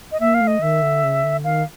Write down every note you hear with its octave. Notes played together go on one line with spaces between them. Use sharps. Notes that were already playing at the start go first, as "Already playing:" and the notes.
D#5
A#3 E5
F5
A3
D#5
D#3 E5
D3
C#3
D3
D#3 F5